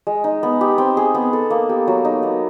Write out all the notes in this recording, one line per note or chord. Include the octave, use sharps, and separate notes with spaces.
G#3
D#4
B3
G4
C4
G#4
B3
A4
A#3
G4
F#3
D#4
B3